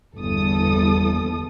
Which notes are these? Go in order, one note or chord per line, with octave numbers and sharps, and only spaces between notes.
G1 E2 A4 D#6